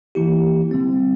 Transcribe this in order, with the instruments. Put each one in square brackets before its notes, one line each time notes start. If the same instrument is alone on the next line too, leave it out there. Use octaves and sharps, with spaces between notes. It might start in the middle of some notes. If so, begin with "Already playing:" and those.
[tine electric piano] E3 A#3 E4 G4
D3 G3 C4